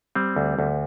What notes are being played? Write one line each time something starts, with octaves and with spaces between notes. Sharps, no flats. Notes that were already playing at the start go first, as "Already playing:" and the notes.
G3 C4
D2
D2